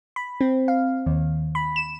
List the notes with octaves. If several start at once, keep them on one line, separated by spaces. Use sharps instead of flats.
B5
C4
F5
D#2
B5
E7